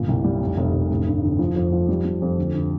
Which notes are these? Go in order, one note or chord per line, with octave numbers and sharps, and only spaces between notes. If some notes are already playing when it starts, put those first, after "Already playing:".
Already playing: G1 A#2
C2
G3
F1
F1
F1
A1
G2
D3
F3
F2
F3
G3
G3
F2
D2
D2